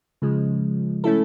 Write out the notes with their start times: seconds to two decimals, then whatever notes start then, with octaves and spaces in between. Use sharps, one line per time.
0.22 C#3 F3 G#3
1.04 A3 C#4 E4 A4